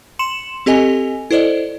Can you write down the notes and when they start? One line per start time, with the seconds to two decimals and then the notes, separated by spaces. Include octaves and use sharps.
0.19 C6 C#7 E7 F#7
0.66 C4 G4 A4 D#5 G#5
1.31 E4 A4 C5 D5 D#5